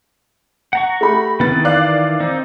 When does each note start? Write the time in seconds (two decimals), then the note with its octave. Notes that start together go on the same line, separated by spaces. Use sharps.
0.73 F#5 A#5 C#6
1.01 A3 G4 B5
1.40 D#3 E3 B3 A6
1.65 D5 F5 F#6
2.20 C4 D#4